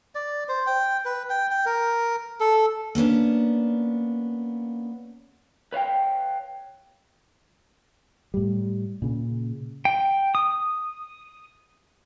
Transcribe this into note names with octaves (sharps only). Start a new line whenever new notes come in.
D5
C5
G5
B4
G5
G5
A#4
A4
A#3 B3 C#4 D4
B4 C#5 F5 G5
A2 G3
A#2 C#3
G5
D#6